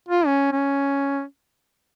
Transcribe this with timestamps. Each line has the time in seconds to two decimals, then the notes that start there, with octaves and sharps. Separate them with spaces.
0.08 F4
0.26 C#4
0.52 C#4